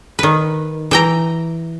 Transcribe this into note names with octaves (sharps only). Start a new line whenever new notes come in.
D#3 B4
E3 G5 A#5